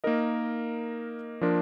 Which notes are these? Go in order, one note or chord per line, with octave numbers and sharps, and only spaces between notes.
A#3 D#4 A#4 D#5
F3 A#3 D4 F4 A#4